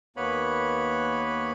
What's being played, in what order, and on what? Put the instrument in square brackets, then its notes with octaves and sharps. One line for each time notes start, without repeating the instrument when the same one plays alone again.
[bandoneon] D#2 A#3 B3 B4 C#5 B5